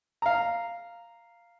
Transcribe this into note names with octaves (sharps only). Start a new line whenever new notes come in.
F5 A#5